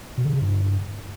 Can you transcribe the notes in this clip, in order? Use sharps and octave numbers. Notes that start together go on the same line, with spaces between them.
B2
D3
C#3
G2